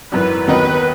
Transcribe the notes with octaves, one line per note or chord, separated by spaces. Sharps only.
G#1 F#2 E3 B4
D#2 D#3 F#3 B3 D#4 B4